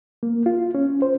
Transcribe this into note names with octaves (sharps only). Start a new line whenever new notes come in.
A#3
F4
C#4
C5